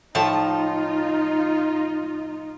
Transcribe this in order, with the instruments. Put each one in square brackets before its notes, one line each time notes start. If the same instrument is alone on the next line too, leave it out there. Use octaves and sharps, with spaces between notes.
[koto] A2 F3 A5 [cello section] D#4 F4